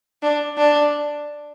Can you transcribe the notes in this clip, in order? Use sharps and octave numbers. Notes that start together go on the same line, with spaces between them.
D4
D4